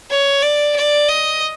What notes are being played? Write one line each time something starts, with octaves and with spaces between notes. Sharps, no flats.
C#5
D5
D5
D#5